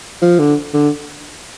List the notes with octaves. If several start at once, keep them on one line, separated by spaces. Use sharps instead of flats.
F3
D3
D3